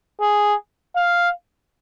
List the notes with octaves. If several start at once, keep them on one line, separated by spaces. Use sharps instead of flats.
G#4
F5